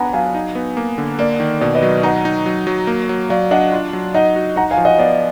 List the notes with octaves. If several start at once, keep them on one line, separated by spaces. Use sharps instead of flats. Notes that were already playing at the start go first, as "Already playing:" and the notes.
Already playing: B3 D4 F#5 G#5 A#5 B5
F#3 F5 G#5
D#4
B3
A#3
D3
A#3 D5
D#3
B2 D5
B4 D#5
F#3
D#4 F#5 A#5
D#4
F#3
F#3
A#3
F#3
F#3 D5 F5
D4 D#5 F#5
F4
F#3
D#4 D#5 F#5
F#4
D#4 F#5 A#5
F5 G#5
F3
D#5 F#5
B3 D5 F5